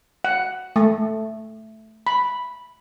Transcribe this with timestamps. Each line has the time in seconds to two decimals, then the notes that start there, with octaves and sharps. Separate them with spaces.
0.24 F#5
0.76 A3
2.07 B5